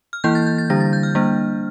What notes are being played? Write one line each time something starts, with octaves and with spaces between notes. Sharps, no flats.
F6
E3 A#3 E4 G6
A6
G6
A6
D3 G3 D4 A#6
A6
G6
F6
G3 A#3 D4